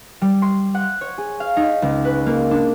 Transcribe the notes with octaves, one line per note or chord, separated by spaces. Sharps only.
G3
C6
F#5
C#5
G#4
F5
D#4
C#2
B4
A#3
D4